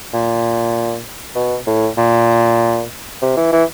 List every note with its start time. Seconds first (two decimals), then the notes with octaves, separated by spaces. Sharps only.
0.13 A#2
1.36 B2
1.67 A2
1.98 A#2
3.22 C3
3.37 E3
3.53 E3